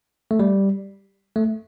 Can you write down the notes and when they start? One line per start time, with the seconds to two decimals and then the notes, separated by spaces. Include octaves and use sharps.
0.31 A3
0.39 G3
1.36 A3